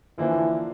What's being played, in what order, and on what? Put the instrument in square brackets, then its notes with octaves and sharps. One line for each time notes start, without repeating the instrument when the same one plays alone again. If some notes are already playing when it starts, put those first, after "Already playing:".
[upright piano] D3 F3 A#3 D4 [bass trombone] E3